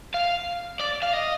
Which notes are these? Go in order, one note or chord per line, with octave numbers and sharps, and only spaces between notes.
F5
D5
F5
D#5